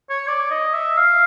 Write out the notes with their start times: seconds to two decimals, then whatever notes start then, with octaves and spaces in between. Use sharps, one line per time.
0.10 C#5
0.28 D5
0.51 D#5
0.74 E5
0.98 F5